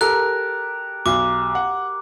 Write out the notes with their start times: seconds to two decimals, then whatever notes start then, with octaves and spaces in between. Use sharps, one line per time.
0.01 G4 A4 A#4 F#6
1.06 B1 D6
1.55 F#5